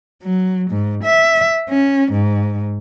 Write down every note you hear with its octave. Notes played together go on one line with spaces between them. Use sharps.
F#3
G#2
E5
C#4
G#2